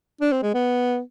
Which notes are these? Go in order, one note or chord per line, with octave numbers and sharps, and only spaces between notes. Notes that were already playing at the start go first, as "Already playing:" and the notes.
D4
C4
G#3
B3